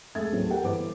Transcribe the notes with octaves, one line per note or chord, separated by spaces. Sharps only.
F1 G#3 A4 E5 G#6 A6
D#2 A2 F#3 A3 B3 C4
G4 A4 A#4 F#5 G5
G1 E3 B4 C5 D6